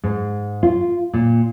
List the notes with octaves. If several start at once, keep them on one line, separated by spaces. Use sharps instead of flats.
G#2
F4
A#2